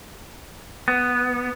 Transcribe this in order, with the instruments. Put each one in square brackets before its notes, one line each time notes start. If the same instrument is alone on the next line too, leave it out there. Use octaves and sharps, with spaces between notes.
[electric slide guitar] B3